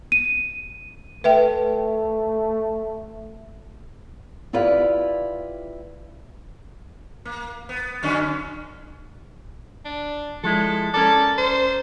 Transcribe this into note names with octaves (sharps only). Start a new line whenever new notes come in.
D#7
A3 B4 E5 G5
E4 F4 G4 B4 D5 F5
A#3
B3
F#2 D3 C#4
D4
F3 G#3 E4 A4
C#4 A4 A#4 D5
C5